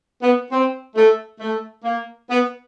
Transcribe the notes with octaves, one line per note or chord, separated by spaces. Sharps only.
B3
C4
A3
A3
A#3
B3